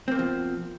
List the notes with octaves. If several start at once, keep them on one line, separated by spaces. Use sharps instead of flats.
B2 F3 A#3 C4